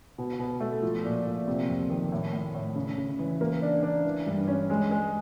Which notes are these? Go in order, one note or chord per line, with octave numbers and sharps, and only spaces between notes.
B2
B2
A3
F3
A#2
A#2
C3
F2
D#3
A2
A2
A2
C#3
C#3
E3
A#3
D4
D4
E3
G2
C#4
G#3
G#3